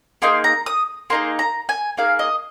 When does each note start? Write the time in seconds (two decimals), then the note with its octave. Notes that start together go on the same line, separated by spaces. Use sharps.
0.22 A#3 D#4 G#4 C6
0.44 A#5
0.66 D#6
1.10 A#3 D#4 G#4 C6
1.39 A#5
1.69 G#5
1.97 A#3 D#4 G#4 F5
2.19 D#5